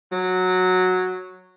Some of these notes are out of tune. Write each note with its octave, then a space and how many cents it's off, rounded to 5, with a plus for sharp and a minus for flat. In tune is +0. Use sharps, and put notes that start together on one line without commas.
F#3 -10